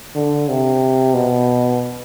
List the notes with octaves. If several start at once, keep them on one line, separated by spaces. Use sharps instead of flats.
D3
C3
B2